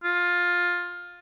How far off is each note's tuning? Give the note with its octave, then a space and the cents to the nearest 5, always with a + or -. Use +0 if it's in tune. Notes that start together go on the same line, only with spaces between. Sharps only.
F4 +15